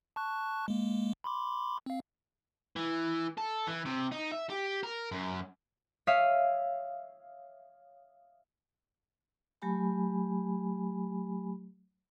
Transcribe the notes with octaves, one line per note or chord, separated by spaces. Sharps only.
A5 C#6 F#6
G#3 A#3
B5 C6 D6
C4 F5
E3
A4
E3
C3
D#4
E5
G4
A#4
F#2
C#5 E5 F5 D#6 B6
F#3 A3 G4 G#5 B5